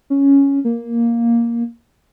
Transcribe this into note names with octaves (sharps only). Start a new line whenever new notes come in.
C#4
A#3